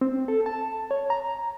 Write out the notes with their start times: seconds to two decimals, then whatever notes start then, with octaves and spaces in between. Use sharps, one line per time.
0.01 C4
0.28 A4
0.46 A5
0.91 C#5
1.10 A#5